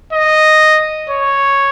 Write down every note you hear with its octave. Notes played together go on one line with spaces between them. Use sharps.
D#5
C#5